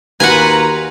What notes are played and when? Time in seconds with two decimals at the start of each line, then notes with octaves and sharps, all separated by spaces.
0.20 D#2 F4 F#4 B4 F#5 G#5 A#5